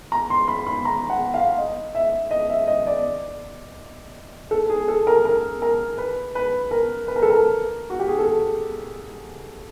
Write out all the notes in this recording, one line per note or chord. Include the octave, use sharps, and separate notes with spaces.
A#5
C6
B5
B5
A#5
F#5
F5
D#5
E5
D#5
E5
D#5
D5
A4
G#4
A4
A#4
A#4
A#4
B4
B4
A#4
B4
A#4
A4
A#4
F#4
G4
G#4
A4